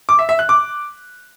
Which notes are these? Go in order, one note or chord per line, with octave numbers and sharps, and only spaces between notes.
D6
E5
E5
F#6
D6